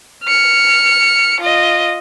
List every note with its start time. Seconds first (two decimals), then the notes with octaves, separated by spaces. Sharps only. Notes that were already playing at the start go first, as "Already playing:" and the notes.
0.24 F6 C#7
1.41 F4 D#5